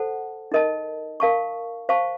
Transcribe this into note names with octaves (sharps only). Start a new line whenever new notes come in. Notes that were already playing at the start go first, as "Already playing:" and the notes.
Already playing: A4 C5 F#5 A5
D#4 A#4 D#5 A5
A#4 F5 A5 C#6
C5 F5 A5 C#6